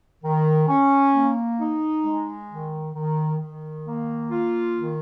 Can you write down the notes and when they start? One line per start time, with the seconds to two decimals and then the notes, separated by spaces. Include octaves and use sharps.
0.24 D#3
0.68 C#4
1.14 A#3
1.60 D#4
2.04 G#3
2.50 D#3
2.95 D#3
3.40 D#3
3.86 A#3
4.31 F4
4.76 D#3